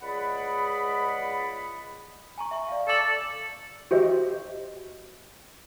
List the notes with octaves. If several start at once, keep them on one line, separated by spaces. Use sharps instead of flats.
C#2 G#4 D5 D#5 F#5 B5
G#5 A#5 C#6
E5 C#6
D5 F5
A4 D5 D6 F#7
F#4 G4 C5 D#5 E5